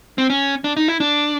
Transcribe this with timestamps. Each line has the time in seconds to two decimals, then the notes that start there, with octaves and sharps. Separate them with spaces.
0.18 C4
0.30 C#4
0.64 D4
0.77 D#4
0.88 E4
1.00 D4